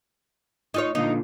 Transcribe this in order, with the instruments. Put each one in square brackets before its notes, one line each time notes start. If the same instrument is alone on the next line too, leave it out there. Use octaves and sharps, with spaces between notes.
[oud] D#4 F4 C#5
[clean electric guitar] A#2 D3 F4 [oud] D#4